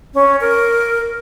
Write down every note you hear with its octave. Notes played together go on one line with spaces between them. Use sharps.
C#4
A#4